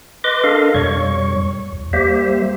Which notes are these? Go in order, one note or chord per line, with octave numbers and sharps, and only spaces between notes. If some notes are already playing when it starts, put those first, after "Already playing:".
B4 D#5 C6 D6
D4 A4 A#4 D#5 F5
F2 B2 G3 C#5 C#6
E2
G3 A#3 G4 C5 E5